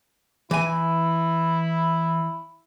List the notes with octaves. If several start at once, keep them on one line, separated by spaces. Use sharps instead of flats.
E3 E4 G#5